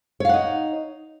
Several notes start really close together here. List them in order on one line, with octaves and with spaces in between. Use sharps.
C#5 F5 F#5 D#4